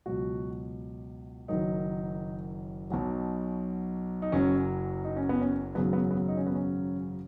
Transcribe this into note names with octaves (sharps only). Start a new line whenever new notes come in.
C#2 B2 F#3 F#4
F#1 F#2 D#3 F#3 D#4
B1 B2 F#3
D#4
F#1 F#2 F#3 C#4
D#4
C#4
B3
C#4
G#1 F#2 C#3 F#3 B3
B3
B3
D#4
C#4
B3
C#4